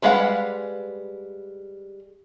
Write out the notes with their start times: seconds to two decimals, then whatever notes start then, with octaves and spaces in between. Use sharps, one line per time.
0.02 G3 G#3 B4 F5 F#5